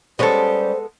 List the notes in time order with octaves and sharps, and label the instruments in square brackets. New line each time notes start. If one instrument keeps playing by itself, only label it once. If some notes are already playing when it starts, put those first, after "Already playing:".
[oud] G3 C#4 [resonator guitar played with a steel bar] G#3 B3 A4 [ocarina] C5